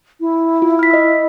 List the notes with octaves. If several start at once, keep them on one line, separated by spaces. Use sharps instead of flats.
E4
F4
F6 B6
D#5 E6